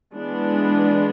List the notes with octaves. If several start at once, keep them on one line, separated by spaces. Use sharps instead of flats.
E3 G#3 B3 D4